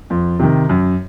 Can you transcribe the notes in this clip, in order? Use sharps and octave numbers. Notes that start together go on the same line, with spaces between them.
F2
C3 D#3
F#2